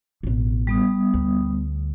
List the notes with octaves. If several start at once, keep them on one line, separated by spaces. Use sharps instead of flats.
A1 B2
G3 B3 D#6
D2